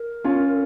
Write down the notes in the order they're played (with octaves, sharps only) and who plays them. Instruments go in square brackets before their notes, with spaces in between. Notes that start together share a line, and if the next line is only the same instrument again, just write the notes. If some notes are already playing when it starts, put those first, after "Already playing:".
Already playing: [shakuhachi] A#4
[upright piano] C#4 F4